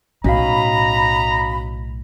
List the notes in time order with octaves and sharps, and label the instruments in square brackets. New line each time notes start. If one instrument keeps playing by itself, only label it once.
[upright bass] B1 A2 [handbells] C#4 F#4 F5 [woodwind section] D#5 B5 [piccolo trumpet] A#5